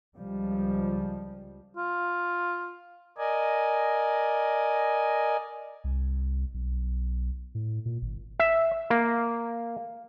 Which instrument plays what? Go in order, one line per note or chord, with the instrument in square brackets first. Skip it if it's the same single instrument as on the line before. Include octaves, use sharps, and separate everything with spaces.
[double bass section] C#2 F3 G3
[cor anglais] F4
[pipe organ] A#4 D5 D#5 G#5
[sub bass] C2
B1
A2
A#2
G#1
[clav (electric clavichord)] E5
A#3